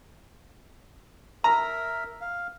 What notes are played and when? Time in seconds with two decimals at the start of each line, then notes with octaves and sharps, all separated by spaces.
1.44 A#4 E5 A#5
2.21 F5